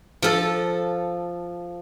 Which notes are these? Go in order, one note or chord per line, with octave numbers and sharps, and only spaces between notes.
F3 A4